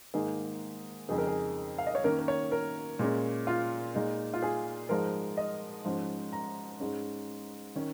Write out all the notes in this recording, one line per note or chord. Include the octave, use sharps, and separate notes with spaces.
G#2 D#3 A#3 D#4 G#4
F2 C#3 G#3 D#4 G#4
A#4
G#4
F5
D#5
C#5
D#3 A#3 C#4 A#4
A#4
C#5
A#4
A#2 G#3 C#4
F4
A#2 G#3 D#4
F4
G#4
G#2 F3 G#3 A#4
D#5
G#2 F3 G#3 C#4
A#5
G#2 G#3 C#4
D#3 C#4